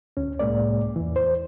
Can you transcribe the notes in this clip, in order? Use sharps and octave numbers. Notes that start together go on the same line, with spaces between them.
D2 C#4
C2 A2 G#3 A#3 D5
E2 E3
C5